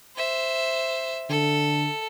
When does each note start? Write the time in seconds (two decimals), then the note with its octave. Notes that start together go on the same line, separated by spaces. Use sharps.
0.16 C5 E5
1.30 D3 A4